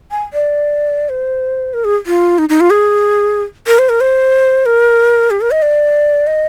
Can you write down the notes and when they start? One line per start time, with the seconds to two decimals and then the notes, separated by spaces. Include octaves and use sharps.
0.11 G#5
0.33 D5
1.09 C5
1.74 A#4
1.85 G#4
2.06 F4
2.38 D#4
2.49 D#4
2.60 F4
2.70 G#4
3.67 A#4
3.79 C5
3.89 A#4
4.01 C5
4.66 A#4
5.31 G4
5.41 A#4
5.51 D#5
5.62 D5
6.27 D#5